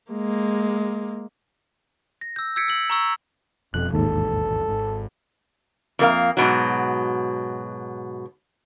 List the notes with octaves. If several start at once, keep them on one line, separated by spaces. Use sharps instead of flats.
G#3 A#3
A#6
E6 G6
E6 G6 G#6 B6 C#7 D7
E6 F#7
A#5 C#6 E6
F1 F2 B2 F3 F#6
E1 A1 D#2 G#2 A4
G#1 G#2
F2 A#3 F5
G#2 B2 F#3